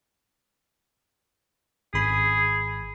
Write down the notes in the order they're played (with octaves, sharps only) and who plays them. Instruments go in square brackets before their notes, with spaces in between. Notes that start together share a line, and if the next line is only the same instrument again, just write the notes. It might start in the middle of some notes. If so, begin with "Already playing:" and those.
[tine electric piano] G#1 B5 [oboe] G#4